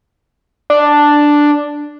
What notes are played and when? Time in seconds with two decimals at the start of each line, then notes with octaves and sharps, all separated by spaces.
0.70 D4